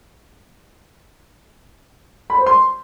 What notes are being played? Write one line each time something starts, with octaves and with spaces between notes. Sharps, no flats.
B5
C5
C6